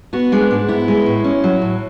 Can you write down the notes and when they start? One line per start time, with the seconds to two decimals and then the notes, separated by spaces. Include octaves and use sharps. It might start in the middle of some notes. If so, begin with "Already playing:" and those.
0.13 B3 F#4
0.32 G#3 D4
0.50 G#2 D4
0.68 B3 E4
0.88 G#3
1.06 A2
1.24 C#4
1.44 F#3
1.62 A2